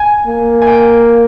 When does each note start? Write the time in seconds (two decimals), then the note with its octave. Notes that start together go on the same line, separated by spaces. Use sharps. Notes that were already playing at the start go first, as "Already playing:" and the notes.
Already playing: G#5
0.26 A#3
0.62 G#5
0.67 G5